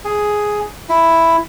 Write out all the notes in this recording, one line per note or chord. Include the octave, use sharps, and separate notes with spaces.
G#4
E4